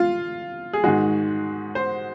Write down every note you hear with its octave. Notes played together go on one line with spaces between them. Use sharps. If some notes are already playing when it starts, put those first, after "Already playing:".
Already playing: F4
G#4
G#2 D#3 G#3 F#4
C5